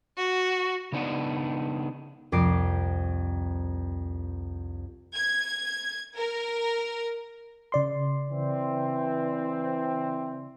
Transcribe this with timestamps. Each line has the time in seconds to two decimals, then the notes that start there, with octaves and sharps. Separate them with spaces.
0.18 F#4
0.92 C#3 B3 D4 D#4 D5 F#5
2.32 C2 F2 D6 C7 D7
5.15 G#6
6.17 A#4
7.72 C#3 D5 C6
8.30 E3 C4